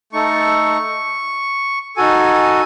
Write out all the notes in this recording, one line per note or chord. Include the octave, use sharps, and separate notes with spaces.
A3 D#4 A4 C#6
D#4 F#4 A4 G#5